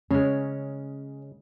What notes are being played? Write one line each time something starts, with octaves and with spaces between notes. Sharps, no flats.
C#3 G#3 C#4